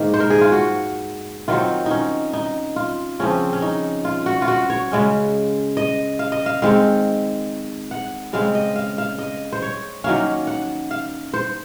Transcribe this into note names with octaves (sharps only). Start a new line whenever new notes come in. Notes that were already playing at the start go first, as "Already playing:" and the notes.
Already playing: G#2 D#3 A#3
C5
A#4
G#4
F4
F#4
D#3 F#3 C4 F4
C#4 D#4
D#4
F4
C#3 F3 C4 C#4
C#4
D#4
F4
F#4
F4
F#4
C#5
C#3 G#3 C#4
D#5
F5
D#5
F5
D#3 G#3 C4 F5
F#5
C#3 G#3 C4 F5
D#5
F5
F5
D#5
C5
C#5
D#3 F#3 A#3 C#4 F5
F#5
F5
C5